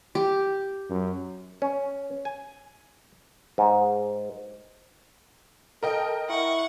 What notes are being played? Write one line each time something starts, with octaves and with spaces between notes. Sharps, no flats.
G4
F#2
C#4
G#5
G#2
A4 A#4 D#5 G5
E4 F#5 C#6